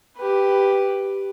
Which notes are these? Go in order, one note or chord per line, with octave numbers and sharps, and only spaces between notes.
G4 B4